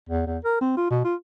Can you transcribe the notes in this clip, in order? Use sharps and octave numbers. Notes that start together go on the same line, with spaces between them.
E2
E2
A#4
C4
F4
B2
F4